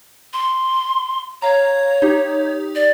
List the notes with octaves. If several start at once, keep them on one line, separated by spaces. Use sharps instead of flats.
C6
C#5 F5 A#5
D#4 G4
D5